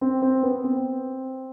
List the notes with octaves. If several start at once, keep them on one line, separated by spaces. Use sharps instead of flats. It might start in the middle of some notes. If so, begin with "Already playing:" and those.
C4
C4
B3
C4